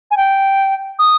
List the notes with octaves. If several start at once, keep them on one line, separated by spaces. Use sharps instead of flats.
G#5
G5
D#6